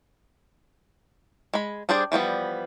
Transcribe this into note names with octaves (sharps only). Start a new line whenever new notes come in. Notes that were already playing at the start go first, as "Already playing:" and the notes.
G#3 B5
G3 D4 G#4 C5 D5
E3 F3 G3 B3